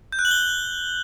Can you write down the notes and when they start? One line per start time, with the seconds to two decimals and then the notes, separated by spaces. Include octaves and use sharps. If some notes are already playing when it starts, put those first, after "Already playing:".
0.12 G6
0.19 F#6
0.25 F#7
0.31 G7